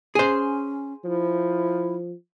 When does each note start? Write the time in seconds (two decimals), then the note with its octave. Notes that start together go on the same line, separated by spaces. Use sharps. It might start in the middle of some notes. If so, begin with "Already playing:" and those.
0.15 C#4 G#4 C5
1.04 F3 E4